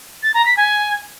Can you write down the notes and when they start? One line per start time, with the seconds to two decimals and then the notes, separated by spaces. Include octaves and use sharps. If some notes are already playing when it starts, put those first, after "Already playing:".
0.23 A6
0.34 A#5
0.45 B6
0.57 G#5